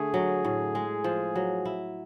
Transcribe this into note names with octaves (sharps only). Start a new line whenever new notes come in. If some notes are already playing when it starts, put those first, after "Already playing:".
Already playing: D3 A3 G#4
F#3
A2
G#3
F3
F#3
E4